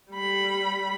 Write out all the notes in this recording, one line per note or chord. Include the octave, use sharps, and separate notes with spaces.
G3 B5